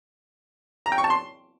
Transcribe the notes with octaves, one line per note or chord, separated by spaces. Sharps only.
A#5
G5
C#6
A5
C6